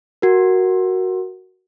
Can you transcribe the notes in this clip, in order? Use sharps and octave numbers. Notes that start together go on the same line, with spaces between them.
F#4 A#4